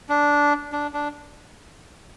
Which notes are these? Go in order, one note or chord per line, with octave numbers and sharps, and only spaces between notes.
D4
D4
D4